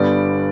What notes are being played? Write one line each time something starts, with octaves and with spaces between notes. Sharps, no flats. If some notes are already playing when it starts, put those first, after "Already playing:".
Already playing: G1 G2 G3 B3 D5